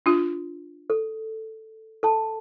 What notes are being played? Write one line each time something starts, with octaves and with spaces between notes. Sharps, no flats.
D4 F4
A4
A4 A5